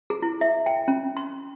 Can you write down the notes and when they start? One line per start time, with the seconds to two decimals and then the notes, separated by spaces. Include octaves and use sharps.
0.10 G#4
0.22 E4
0.41 E5
0.66 G5
0.88 C#4
1.17 C6